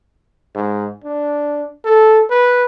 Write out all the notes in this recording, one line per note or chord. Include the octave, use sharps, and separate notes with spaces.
G#2
D4
A4
B4